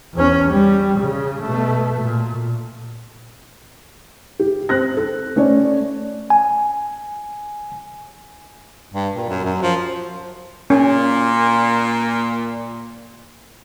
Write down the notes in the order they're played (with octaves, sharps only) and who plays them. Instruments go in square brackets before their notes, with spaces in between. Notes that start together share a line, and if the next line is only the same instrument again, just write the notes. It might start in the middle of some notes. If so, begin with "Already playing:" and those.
[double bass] E2 C#4
G3
C#3
B2 A3
A#2
[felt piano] G4
C4 F#6 A#6
A4
A3 C#4 C#5 D5
[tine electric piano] G#5
[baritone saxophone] G2
A#2
F#2
F#2
F3
[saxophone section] A#2 [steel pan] C#4